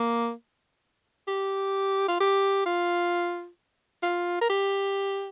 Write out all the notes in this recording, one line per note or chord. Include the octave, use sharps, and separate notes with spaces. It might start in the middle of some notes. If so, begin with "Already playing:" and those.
Already playing: A#3
G4
F4
G4
F4
F4
A#4
G4